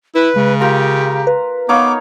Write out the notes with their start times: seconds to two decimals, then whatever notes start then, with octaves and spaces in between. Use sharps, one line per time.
0.15 E4 B4
0.36 C#3 G#3
0.60 F4 G4 A#4 A#5
1.27 B4
1.69 B3 D#4 C#5 F5 D6